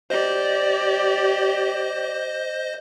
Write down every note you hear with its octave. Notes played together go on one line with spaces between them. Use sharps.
G4 C5 D5 D#5